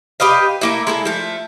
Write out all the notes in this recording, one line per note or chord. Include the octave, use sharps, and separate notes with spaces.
G4 B4 D#5 F5
A3 A#3 E4
G#3 E4 A4
F3 A3